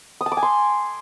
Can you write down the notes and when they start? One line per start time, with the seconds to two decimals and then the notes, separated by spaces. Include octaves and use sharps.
0.21 D#6
0.26 A5
0.32 D6
0.37 G#5
0.43 C6